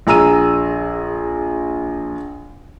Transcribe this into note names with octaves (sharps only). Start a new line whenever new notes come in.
A#1 G#4 A#5 E6 D#7